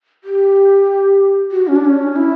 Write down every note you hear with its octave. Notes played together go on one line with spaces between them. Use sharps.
G4
F#4
C#4
D4
C#4
E4